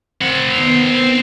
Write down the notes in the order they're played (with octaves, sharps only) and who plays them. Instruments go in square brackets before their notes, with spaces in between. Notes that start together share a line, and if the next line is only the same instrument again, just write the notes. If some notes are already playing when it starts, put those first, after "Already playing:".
[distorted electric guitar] C4 F#5
[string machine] D#3 B3